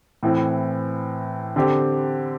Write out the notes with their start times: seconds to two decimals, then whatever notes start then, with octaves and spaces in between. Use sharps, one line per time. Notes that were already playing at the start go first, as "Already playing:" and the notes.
0.23 A2 E3 C4
1.56 D3 C4 G4